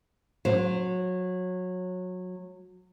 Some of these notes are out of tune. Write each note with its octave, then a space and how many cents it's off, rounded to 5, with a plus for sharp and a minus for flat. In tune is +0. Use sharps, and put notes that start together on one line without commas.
F#3 -20 C5 +0